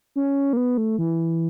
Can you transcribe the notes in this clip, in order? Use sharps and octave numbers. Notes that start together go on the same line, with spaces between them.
C#4
A#3
B3
A3
E3